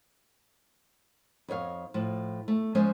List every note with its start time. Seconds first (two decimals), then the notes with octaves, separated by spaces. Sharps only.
1.48 F2 D#4 C#5 F5
1.94 A2 F3
2.48 A3
2.75 F3 G#3 C#4 C5